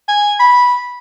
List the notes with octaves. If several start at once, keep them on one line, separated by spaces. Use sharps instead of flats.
G#5
B5